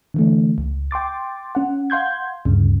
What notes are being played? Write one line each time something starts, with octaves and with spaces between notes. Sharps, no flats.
D3 E3 A3
C#2
G5 C6 D6 A6
C#4 F#5
F5 F#5 C6 G6 G#6
D2 G2 C#3